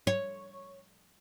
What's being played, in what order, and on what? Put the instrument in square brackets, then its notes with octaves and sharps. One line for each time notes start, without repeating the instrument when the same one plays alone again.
[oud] C#5